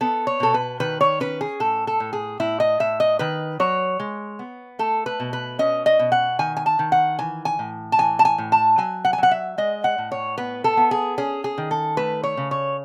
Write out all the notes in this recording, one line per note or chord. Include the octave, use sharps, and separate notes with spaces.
B3 A4
C#5
B2 A4
B4
D#3 B4
C#5
C#4 B4
G#4
A2 A4
A4
A2
G#4
A2 E4
D#5
A2 E5
D#5
D#3 B4
F#3 C#5
G#3
B3
A3 A4
B4
B2
B4
C#4 D#5
D#5
B2
F#5
D#3 G#5
G#5
A5
D#3
F#5
E3 G#5
G#5
A2
A5
E3 G#5
A5
G#5
A2
A5
F#3 G#5
F#5
G#5
F#3 F#5
E5
G#3 D#5
F#5
A2
C#5
B3 B4
A4
B3
G#4
C#4 G#4
G#4
D#3
A4
A3 B4
C#5
C#3
C#5